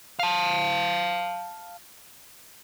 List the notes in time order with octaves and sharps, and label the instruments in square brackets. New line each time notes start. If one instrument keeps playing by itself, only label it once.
[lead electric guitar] F5 A5